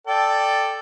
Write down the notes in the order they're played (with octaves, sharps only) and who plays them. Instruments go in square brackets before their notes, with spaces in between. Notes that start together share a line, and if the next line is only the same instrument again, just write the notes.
[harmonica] A4 D5 G5